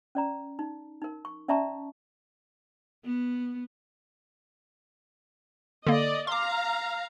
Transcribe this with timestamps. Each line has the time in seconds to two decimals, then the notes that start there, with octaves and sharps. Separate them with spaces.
0.15 C#4 D5 A#5
0.59 D#4
1.02 D#4 A#4
1.25 C#6
1.48 C#4 D5 E5 A5 A#5 C#6
3.05 B3
5.86 D3 A#3 D5 D#5
6.27 F5 A#5 C6 D6